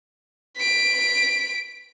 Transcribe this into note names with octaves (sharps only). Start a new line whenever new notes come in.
B6 D7